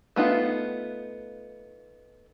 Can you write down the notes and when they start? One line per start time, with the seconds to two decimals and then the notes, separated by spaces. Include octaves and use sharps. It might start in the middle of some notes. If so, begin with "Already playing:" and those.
0.16 A3 B3 D#4 F4